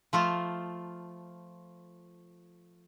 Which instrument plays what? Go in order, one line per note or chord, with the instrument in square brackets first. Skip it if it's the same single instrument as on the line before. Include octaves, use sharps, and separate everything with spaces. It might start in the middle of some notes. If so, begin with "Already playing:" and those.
[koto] F3 A3 F4